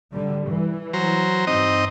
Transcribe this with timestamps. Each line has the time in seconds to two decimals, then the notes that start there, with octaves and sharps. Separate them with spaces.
0.13 D3 G3
0.47 E3
0.93 F#3 C5 A#5
1.47 G2 C4 D#4 D#5